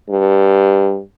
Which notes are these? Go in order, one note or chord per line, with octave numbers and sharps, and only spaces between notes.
G2